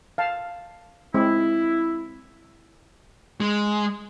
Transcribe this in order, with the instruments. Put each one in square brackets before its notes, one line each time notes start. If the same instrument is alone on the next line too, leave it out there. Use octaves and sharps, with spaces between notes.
[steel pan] F5 A5
[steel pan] G#3 C4 [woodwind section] E4
[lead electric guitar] G#3